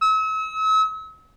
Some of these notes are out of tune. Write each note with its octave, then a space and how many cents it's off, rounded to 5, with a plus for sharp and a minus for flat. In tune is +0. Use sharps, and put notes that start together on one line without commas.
E6 -40